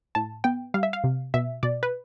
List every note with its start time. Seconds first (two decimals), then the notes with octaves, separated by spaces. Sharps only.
0.15 A2 A5
0.44 B3 G5
0.74 G3 F5
0.83 E5
0.93 F5
1.04 C3
1.34 B2 E5
1.63 B2 D5
1.83 B4